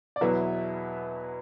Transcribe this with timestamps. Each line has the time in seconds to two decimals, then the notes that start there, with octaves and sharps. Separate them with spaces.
0.16 D5
0.21 E2 B2 F#3 B3 E4 E5